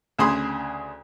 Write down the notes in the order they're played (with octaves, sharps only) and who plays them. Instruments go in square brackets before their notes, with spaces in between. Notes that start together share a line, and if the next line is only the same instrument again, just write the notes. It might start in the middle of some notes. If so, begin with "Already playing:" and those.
[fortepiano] D2 C#3 G#4 B5 C6 D#6